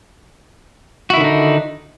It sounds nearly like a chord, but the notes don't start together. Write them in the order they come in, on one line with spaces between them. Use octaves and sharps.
F#4 E4 D#3 D3 D#4